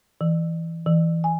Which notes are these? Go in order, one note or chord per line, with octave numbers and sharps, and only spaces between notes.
E3
E3
G#5